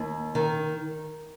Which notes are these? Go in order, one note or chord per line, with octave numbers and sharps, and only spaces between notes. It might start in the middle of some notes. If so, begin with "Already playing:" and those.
Already playing: D#2
D#3